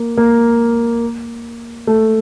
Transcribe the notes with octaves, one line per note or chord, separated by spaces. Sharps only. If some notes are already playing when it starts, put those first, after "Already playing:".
Already playing: A#3
A#3
A3